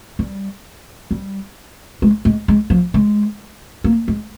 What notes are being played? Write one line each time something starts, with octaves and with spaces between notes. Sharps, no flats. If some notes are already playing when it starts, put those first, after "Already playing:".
G3
G3
G#3
G#3
G#3
F3
G#3
A#3
G#3